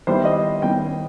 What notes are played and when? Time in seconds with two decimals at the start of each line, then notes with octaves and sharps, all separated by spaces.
0.07 D#3 G3 B3 E4 C5
0.25 D#5
0.62 D#3 G3 B3 E4 G5